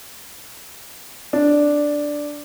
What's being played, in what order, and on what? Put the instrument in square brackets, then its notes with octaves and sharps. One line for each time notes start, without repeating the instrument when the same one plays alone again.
[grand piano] D4